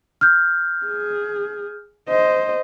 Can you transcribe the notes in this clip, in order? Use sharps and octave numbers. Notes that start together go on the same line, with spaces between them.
F6 G6
G#4
C5 D#5